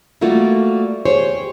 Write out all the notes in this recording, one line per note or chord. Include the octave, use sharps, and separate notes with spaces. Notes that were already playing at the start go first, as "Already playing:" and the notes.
G3 A3 A#3 F4 F#4
G4 G#4 C5 C#5